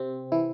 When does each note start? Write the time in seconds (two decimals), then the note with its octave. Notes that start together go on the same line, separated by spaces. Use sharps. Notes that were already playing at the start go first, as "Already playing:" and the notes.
Already playing: C3 C4
0.32 E3 E4